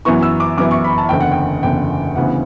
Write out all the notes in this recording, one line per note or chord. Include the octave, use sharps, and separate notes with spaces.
F#2 E3 B3 E4 C#6
E6
D6
F#2 E3 B3 E4 D6
C#6
B5
A5
F#1 E2 D3 G5
F#5
G5
F#1 E2 D3 G5
D2 C#3 E3 B3 F#5